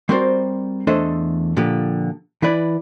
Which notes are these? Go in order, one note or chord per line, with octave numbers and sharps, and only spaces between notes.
G3 C4 F#4 A#4 C5 D5
E2 A3 D4 A4 C5 D#5
A#2 D3 F3 G4
E3 E4 B4 D5